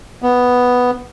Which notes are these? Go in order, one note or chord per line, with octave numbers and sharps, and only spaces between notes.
B3